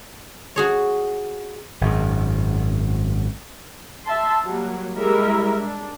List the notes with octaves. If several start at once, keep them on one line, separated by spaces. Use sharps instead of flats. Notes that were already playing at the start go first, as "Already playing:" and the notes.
F#4 G#4 C#5
G#1 F#2
E5 A5 C6
F#3 G3 A#3
G3 G#3 E4 A#4 E5
D4